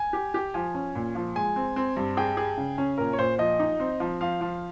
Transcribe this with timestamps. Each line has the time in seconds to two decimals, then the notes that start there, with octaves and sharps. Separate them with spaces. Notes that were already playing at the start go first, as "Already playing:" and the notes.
Already playing: G#5
0.13 G4
0.34 G4
0.54 F3 G#5
0.74 C#4
0.95 A#2
1.15 F3
1.36 G#3 G#5
1.56 C4
1.76 C4
1.97 G2
2.17 G#4 G5
2.37 G#4
2.58 C#3
2.78 C#4
2.98 A#2 A#4
3.13 C#5
3.19 A#2 C5
3.38 F3 D#5
3.59 D#4
3.80 C4
4.00 F3
4.21 F3 F5
4.41 F3